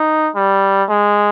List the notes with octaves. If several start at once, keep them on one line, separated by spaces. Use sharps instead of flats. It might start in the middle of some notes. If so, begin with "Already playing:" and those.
Already playing: D#4
G3
G#3